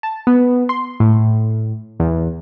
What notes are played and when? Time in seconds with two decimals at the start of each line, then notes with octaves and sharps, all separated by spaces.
0.03 A5
0.27 B3
0.69 C6
1.00 A2
2.00 E2